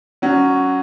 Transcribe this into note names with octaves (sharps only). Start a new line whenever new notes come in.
F#3 C#4 F#4